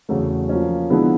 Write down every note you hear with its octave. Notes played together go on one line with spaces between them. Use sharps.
E2 C#3 F#3 A3
F3 A#3 C#4
D3 F3 G#3 B3 E4